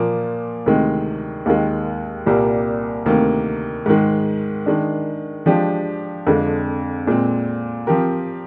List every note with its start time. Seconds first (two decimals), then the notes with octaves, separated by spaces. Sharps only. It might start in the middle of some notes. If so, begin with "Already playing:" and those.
Already playing: A#2 F3 A#3
0.66 D2 C3 D#3 G#3
1.46 D#2 D#3 G#3
2.26 C2 A#2 G3 A#3
3.06 D2 C3 D#3 A#3
3.86 G#2 D#3 G#3
4.66 D#3 G#3 D4
5.46 F3 G#3 D4 G4
6.27 F2 D3 G#3
7.07 A#2 G#3 C4
7.87 F3 C4 G4 A#4